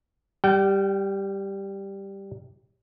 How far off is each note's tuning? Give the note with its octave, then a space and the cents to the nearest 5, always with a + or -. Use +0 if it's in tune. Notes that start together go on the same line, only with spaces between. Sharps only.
G3 +0 G5 -35